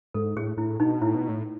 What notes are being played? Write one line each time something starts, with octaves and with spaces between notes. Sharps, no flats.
G#2 A4
A2 G#4
A2 E4
B2 D#4
A2 E4
B2
A2